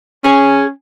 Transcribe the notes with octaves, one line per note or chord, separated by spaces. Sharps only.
C#4 G#4 G#5